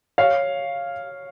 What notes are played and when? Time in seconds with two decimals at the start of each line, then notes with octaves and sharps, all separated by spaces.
0.18 C#5 F5